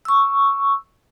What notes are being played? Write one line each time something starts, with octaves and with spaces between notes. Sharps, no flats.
C#6 E6